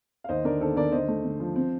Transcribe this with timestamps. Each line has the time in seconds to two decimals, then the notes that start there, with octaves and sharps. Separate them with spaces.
0.24 F5
0.29 D#2 C5 D#5
0.45 D3 A#4 D5
0.60 D#2 A4 C5
0.76 D3 A#4 D5
0.92 D3 C5 D#5
1.08 A3
1.24 D3
1.40 F3
1.56 C4